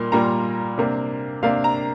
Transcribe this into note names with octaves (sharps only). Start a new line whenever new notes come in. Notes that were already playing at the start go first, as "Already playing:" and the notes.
Already playing: A#2 G3 A#3 C6
A#2 G3 A#3 A#5
C3 A#3 D4
C3 A#3 D4 F5
A#5